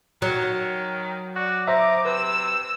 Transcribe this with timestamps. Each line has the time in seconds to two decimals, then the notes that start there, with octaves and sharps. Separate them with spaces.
0.22 D#3 F#3
1.36 F#4 D5
1.67 D#4 C5 E5 D6
2.05 C3 B4 E6